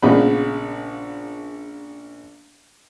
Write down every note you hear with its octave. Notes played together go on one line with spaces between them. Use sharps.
A#1 A#2 C#3 G#3 B3 B5